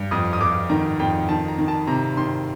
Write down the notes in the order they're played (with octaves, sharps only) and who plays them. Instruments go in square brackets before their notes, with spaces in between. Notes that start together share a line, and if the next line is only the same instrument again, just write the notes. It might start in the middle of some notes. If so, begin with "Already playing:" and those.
Already playing: [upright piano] G2
F2 D#6
D#6
F2 D6
D#3 A#5
F2 G5
D#3 A5
A#5
D#3
A5
C3 A#5
D#3 C6